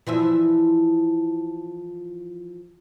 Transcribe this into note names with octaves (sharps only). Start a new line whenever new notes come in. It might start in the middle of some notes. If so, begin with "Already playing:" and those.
E3 F3 E5